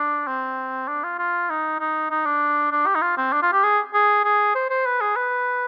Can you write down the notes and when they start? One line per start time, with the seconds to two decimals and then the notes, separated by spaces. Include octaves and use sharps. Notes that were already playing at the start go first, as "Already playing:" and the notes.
Already playing: D4
0.27 C4
0.88 D4
1.03 F4
1.19 F4
1.50 D#4
1.80 D#4
2.11 D#4
2.26 D4
2.71 D4
2.86 G4
2.95 D#4
3.02 F4
3.17 C4
3.32 D4
3.43 F4
3.53 G4
3.63 G#4
3.94 G#4
4.24 G#4
4.55 C5
4.70 C5
4.85 B4
5.01 G#4
5.16 B4